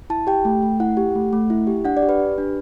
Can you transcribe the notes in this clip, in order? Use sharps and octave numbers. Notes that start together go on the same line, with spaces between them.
E4 A5
G4 G5
A3
A3
E4 F#5
G4
A3
A3
E4
G4
D4 F#5
D5
G4
B4
G4
D4